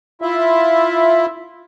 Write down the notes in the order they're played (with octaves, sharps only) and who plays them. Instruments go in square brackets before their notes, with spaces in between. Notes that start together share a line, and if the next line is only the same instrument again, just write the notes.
[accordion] E4 F4 E5